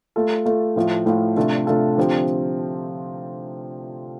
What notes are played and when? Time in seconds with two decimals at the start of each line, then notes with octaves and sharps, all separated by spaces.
0.16 A3 F4 A4
0.46 A3 F4 A4
0.76 A2 F3 A3 F4
1.06 A2 F3 A3 F4
1.37 C3 A3 D4 F4 A4
1.67 C3 A3 D4 F4 A4
1.97 D3 F3 C4 G4